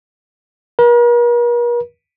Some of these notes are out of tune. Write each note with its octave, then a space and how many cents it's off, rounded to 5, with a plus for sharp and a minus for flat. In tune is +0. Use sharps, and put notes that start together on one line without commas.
A#4 +45